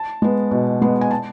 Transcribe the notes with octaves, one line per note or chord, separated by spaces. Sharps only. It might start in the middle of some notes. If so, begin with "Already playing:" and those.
Already playing: A5
G#3 B3
B2
G#3 B3
G#5
A5